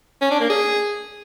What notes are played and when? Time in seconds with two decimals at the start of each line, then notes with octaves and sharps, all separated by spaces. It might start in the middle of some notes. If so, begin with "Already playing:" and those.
0.21 C#4
0.31 D4
0.40 A#3
0.50 G#4